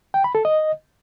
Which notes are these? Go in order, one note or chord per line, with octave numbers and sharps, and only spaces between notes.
G5
B5
A4
D#5